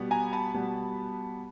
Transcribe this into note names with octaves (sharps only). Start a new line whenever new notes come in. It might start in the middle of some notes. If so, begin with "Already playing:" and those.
Already playing: B2 G3 B3
G#5 A#5
A5 B5
B2 G3 B3